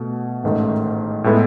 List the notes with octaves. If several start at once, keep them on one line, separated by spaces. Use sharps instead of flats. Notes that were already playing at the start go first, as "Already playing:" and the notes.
Already playing: B2 A3
A1 G#2 D#3 A3
A2 G#3 B3 E4 A4